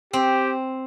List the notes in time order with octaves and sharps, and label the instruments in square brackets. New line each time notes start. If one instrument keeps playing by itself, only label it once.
[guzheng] C4 [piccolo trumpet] G4